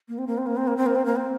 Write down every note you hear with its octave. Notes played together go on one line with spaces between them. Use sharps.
A#3
C4
A#3
C4
A#3
C4
A#3
C4
A#3
C4
A#3
C4